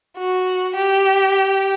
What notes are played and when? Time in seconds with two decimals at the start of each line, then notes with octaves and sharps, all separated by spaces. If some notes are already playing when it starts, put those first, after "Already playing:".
0.18 F#4
0.76 G4